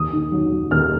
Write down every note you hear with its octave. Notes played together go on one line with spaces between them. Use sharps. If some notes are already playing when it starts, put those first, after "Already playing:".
Already playing: D#2 D#6
D#3
F#3
F#3
D#2 F6